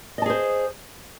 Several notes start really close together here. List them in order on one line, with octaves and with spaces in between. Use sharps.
D#5 A5 G#4 C5